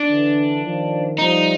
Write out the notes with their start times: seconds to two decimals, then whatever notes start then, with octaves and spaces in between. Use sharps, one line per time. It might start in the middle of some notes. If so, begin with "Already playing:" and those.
Already playing: D4
0.09 D3 E3
0.63 D#3 F3
1.18 F3 G3 D#4